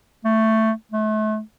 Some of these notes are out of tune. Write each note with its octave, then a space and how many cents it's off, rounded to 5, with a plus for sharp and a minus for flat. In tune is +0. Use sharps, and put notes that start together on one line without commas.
A3 +10
A3 -35